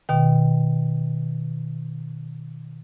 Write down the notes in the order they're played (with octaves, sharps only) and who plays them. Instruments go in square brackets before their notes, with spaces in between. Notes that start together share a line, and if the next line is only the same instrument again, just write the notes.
[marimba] B2 D#3 G5